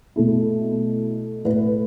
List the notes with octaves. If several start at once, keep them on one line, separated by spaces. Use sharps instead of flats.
B2 A3 E4
A2 A3 E4 B4